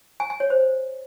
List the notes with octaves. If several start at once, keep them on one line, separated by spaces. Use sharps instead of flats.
G#5
G#5
C#5
C5